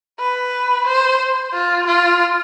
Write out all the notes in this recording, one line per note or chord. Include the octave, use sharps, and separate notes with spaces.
B4
C5
F4
F4